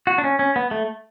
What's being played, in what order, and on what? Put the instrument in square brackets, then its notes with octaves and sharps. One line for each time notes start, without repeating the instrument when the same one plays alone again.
[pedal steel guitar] F#4
D4
C#4
C#4
B3
A3